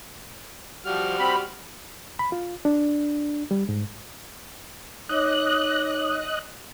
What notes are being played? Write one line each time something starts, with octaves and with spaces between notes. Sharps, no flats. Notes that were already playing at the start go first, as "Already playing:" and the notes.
F3 G3 F#4 F6
C4 B5
B5
F4
D4
G3
G#2
D#4 C#5 D#5 D6 F#6